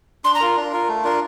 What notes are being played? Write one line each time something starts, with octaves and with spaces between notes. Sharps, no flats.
D4 C6
A#5
F4 A#4
D4
F4 A#4
A3
D4 F4 A#4